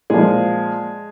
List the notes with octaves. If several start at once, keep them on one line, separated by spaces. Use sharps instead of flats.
A#2 F3 G#3 G#4